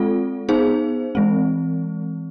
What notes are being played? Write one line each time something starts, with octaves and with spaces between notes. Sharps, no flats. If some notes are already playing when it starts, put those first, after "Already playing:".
Already playing: G#3 C4 F4 A4
B3 D#4 G#4 C5
E3 G#3 C4